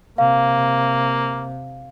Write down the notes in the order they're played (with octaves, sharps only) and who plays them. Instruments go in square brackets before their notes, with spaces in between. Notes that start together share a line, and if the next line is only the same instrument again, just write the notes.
[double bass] C3 [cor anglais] A#3 [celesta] F5